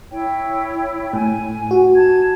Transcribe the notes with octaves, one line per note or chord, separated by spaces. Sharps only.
E4 C#5 G5
A2 G#5
F#4
A5 G#6